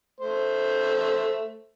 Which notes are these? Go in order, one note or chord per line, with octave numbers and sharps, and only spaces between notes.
A3 C5